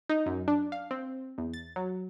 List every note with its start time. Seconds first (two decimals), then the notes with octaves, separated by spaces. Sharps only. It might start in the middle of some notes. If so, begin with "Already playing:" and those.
0.09 D#4
0.26 F#2
0.48 D4
0.72 F5
0.91 C4
1.38 E2
1.54 A6
1.76 F#3